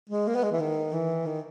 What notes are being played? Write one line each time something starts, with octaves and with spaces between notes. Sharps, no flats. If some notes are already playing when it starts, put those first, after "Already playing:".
G#3
A#3
B3
G#3
E3
D#3
E3
D#3